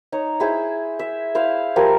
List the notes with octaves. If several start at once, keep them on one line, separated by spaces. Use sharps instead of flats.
D#4 C#5 D#5
E4 G#4 C5
E5
E4 C5 F5
F3 G3 A#4 G#5